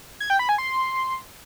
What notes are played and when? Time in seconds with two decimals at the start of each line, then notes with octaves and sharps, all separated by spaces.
0.20 G#6
0.30 G5
0.39 B5
0.49 G#5
0.58 C6